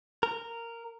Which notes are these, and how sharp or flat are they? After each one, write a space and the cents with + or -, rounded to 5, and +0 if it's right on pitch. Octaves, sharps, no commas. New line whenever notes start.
A#4 -10